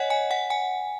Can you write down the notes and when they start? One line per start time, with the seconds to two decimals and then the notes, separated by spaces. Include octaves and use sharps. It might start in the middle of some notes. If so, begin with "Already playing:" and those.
Already playing: C#5 D#5 F#5 G#5
0.10 G#5
0.31 F#5
0.50 G#5